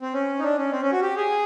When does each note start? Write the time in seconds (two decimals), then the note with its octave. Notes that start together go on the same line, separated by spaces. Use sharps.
0.02 C4
0.14 C#4
0.39 D#4
0.43 D4
0.58 C#4
0.72 C4
0.82 C#4
0.92 F#4
1.02 G4
1.16 G#4